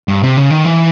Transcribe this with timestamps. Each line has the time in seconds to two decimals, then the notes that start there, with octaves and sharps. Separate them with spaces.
0.08 G2
0.22 C3
0.37 C#3
0.51 D#3
0.65 E3